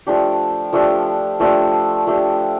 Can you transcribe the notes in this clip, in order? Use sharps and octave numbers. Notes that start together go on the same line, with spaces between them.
F3 A3 D4 G4
F3 A3 D4 G4
F3 A3 D4 G4
F3 A3 D4 G4